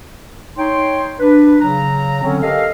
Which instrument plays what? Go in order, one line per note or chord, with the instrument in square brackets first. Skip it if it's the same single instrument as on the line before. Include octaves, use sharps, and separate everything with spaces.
[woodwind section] D#4 C#5 G5 C6
D4 B4
C#3 F#3 A#5
D3 F#3 C4 C#4
G4 A4 A#4 D#5 F5